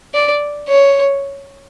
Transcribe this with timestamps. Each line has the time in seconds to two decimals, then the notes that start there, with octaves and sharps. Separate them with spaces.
0.14 D5
0.69 C#5